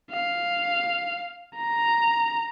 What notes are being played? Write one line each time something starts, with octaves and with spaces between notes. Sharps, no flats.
F5
A#5